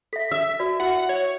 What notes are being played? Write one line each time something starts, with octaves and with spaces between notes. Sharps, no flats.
A4 E5 B6
E5 D#6
F#4 B4 D5
E4 F#4 F#5
C#5